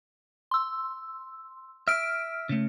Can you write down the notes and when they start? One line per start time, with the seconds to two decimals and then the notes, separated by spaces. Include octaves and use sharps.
0.51 C6 E6
1.88 E5 F6 D7
2.49 C#3 A3